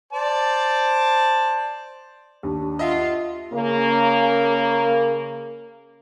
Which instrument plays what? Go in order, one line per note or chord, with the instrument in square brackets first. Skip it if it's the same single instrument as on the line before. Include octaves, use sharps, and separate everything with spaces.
[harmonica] C5 D5 A5
[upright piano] D#2 [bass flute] D4
[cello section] F4 [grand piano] D#5 E5 F#5
[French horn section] C#3 A#3